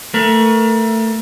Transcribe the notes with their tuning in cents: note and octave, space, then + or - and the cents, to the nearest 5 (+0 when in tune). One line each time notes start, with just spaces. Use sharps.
A3 +20 A#4 +35